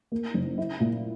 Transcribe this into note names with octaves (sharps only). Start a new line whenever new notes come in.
A#3
F#1
E4
A#2